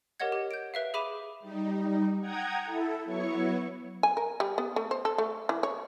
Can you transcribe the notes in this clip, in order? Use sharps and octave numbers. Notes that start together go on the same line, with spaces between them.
G4 A#4 C#5 D#5 F#5 G#6
G4
G6 D7
B4 E5 F5
G#4 E5 B5 D6 D#7 E7
G3 D#4
F#5 G5 A#5 D#6 G#6
E4 A4
F#3 B3 E4 C#5 C#6
G#5
A#4
G3
B3
A3
C5
A4
A3
E3
C#5